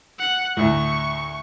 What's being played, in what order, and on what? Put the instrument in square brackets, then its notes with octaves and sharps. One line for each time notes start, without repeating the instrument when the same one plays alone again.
[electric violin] F#5
[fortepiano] D2 A2 [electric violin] C#6